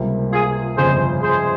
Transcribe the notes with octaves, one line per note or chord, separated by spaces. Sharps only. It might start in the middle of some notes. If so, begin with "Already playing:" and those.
Already playing: C#2 C3 G3 A#3
F4 G#4
G1 F2 C#3 G#4 C5
G#4 C5